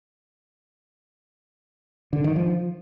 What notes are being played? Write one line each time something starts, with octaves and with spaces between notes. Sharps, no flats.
D3
D#3
F3